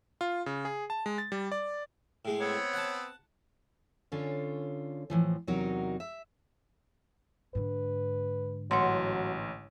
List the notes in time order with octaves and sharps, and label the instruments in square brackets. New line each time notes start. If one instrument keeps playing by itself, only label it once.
[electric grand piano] F4
C#3
G#4
A5
G#3
A6
G3
D5
[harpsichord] A2 G#3 A3
[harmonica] B3 C4 [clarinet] C#5
[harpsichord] F#5 A5
[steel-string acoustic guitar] D3 C#4 F4 C#5
A2 E3 F3
E2 C3 F#3 D#4 F#4 A#4
E5
[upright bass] G#2 D3 [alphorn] B4
[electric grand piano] A1 [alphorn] F#3 [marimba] C#5 F#5 C6